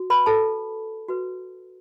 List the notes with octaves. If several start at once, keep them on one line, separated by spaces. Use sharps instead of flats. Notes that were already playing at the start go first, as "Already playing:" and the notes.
Already playing: F#4
B4 B5
A4 A5
F#4 B4